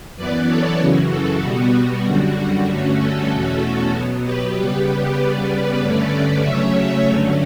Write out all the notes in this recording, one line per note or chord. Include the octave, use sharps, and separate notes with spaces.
F#2 E3 B3 B4 D5
A4 C#5
F#2 C#3 E3 F#4
F#4 A4
B2 G3 B3 F#4
F#4
F#2 D3 G3 F#4
F#4
G2 D3 A3 C#4 F#4
F#4 A4
E2 B2 A3 C#4
B2 F#3 B3
G4 B4
C#3 G3 B3
G4 B4
C#3 G3 B3 B4 D5
G2 D3 A3 C#4 B4 D5
B4 D5
C#3 F#3 A3 C#4 C#5 E5
G2 D3 F#3 A3 C#4